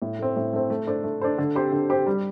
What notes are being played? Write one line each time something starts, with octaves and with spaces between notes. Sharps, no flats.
A2
A3 C4
A2
A3 C4
A3
D4 A4 C5
A3
D4 A4 C5
D3
C4 G4 C5
D3
C4 G4 C5
G3